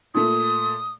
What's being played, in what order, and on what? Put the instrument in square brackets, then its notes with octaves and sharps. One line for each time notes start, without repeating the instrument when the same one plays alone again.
[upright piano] A#2 A3 [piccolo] D#6